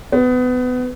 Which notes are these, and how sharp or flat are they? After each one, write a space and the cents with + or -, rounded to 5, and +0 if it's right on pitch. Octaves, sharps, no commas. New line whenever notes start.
B3 +25